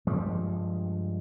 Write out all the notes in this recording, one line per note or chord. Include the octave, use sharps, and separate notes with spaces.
G2 F3 G3 G#3